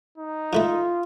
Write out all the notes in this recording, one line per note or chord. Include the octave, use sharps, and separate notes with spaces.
D#4
E3 A3 E4 F4